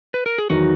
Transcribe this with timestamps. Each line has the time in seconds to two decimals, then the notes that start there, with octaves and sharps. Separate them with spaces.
0.14 B4
0.26 A#4
0.38 G#4
0.50 E2 D#3 F#3 D#4 F#4